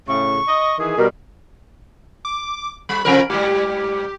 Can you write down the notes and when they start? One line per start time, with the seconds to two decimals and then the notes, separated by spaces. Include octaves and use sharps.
0.08 A2 C#3 C#6
0.48 D#5
0.78 D#3 E3 G#4
0.97 B2 G3 A#4
2.25 D6
2.89 G3 B5
3.05 C3 F3 A#4
3.30 G#2 G3 G4